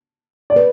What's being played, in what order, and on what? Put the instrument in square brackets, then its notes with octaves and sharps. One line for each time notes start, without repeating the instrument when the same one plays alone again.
[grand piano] D5
[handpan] B4